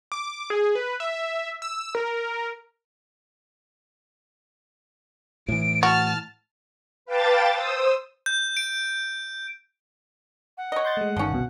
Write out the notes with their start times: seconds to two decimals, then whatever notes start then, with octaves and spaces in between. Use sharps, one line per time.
0.12 D6
0.50 G#4
0.75 B4
1.00 E5
1.62 E6
1.95 A#4
5.48 A2 E3 D7
5.83 F#4 A5 F6
7.06 B4 F5 G5 A5 D6 A6
7.52 C5 D#6 E6
8.26 G6
8.57 D7
10.57 F#5
10.72 C#5 D#5
10.85 C6 G6 A6
10.97 G#3 A3
11.16 G1 D#3 F3 C#4
11.31 C2 B2